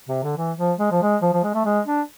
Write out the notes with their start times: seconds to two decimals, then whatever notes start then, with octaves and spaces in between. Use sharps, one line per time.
0.09 C3
0.23 D3
0.37 E3
0.58 F3
0.79 G#3
0.91 F3
1.02 G#3
1.22 F3
1.33 F3
1.44 G#3
1.54 A3
1.65 G#3
1.86 D4